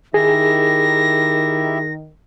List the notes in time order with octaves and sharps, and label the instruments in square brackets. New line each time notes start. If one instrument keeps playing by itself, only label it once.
[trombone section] D#3 [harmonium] E4 G4 E5 [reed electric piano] G#4 [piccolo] A#6